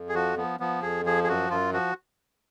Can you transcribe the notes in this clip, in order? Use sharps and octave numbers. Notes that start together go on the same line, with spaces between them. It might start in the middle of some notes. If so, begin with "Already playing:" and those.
Already playing: F2
G#4
F3 F#4
F3 B3
F3 B3
F2 G#4
F3 G#4
G#4
F#2 F#4
F#2 F4
F3 F#4